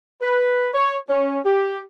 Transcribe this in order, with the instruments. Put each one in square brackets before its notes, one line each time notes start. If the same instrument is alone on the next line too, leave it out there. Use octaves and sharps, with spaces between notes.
[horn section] B4
C#5
C#4
G4